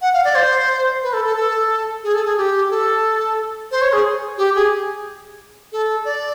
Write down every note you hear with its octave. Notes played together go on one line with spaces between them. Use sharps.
F#5
F5
D5
C5
B4
A4
A4
A4
G#4
A4
G#4
G4
A4
C5
C#5
G#4
G4
G#4
A4
D5